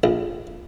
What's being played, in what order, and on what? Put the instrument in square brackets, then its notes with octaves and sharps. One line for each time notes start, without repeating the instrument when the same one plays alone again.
[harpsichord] A#1